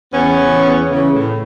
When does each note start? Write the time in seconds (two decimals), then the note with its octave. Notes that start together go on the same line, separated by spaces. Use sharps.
0.13 E2 B3 C#4
0.39 C#3 E3
0.64 E2
0.88 C#3 E3
1.14 A2